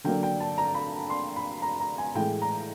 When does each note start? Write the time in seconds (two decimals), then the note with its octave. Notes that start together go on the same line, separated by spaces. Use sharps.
0.04 D3 F#3 A#3 D4 G5
0.23 G5
0.40 A5
0.58 A#5
0.75 B5
1.10 C6
1.36 B5
1.62 A#5
1.80 A#5
1.98 G#5
2.15 A2 E3 G#3 G5
2.42 A#5